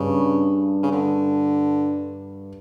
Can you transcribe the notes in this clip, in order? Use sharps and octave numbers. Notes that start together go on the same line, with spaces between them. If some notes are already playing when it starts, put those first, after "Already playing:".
Already playing: G2 C#3
C#3
D3